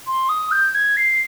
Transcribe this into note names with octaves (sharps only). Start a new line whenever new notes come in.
C6
D#6
G6
G#6
C7